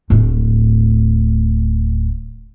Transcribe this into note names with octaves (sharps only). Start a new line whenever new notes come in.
D1 A2